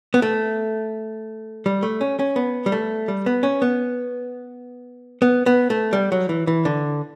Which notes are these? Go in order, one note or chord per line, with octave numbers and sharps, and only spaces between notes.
B3
A3
G3
A3
C#4
C#4
B3
G3
A3
G3
B3
C#4
B3
B3
B3
A3
G3
F#3
E3
E3
D3